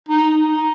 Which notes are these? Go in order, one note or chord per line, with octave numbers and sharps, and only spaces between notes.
D#4
D#4